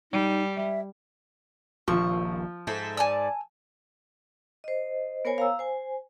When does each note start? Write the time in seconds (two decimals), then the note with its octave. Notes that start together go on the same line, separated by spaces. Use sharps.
0.12 G3 D#4
0.56 E5
1.88 D#1 A#1 F3 C#6
2.67 G#2 A4 C5 E5
2.97 D5 G#5 A5 E6
4.64 C5 D#5
5.25 B3 A#4 C5 C#5 G#5
5.38 F5 A#5 E6
5.59 C5 G#5